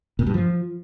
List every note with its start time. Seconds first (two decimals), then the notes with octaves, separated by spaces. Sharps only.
0.19 A#2
0.27 G2
0.34 F3